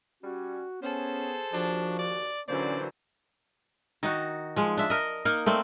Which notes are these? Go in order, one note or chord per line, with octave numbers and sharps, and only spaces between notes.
G3 C#4 F#4
B3 C#4 G#4 A4 C5
D#2 F3 D4 F#4
D5
A#2 D3 E3 F#3 C#4 C5 D5
D#3 D#4 F#4
F3 G#3
D4 E5
A#4 D#5
A#3 D#4 A#4
A3 A#3 C4 D5